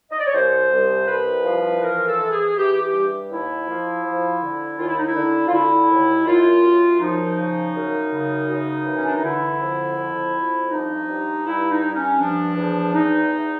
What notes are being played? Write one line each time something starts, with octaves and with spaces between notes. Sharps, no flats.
D#5
D5
C#5
C2 C5
C2
C2 B4
F3
E3 A#4
A4
E3
G#4
E3 G4
G4
G2
D#2 E4
F3
F3
D3
D#2 F4
E4
D#4
E4
D3
F4
D3 E4
D#2
F#2 F4
F#2
F3 D#4
C#3
F#2
C#3
F#2
E3
C#4
D4
D#4
D3 E4
F2
F2
F2
G2 D#4
G2
G2 E4
D#4
G2
C#4
F3 D4
E2
E2 D#4
E2